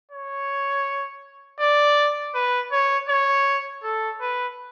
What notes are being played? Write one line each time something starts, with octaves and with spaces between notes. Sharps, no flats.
C#5
D5
B4
C#5
C#5
A4
B4